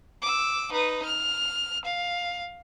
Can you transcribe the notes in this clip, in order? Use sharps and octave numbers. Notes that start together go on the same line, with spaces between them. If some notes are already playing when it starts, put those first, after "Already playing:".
D6 E6
D#4 B4
F6
F5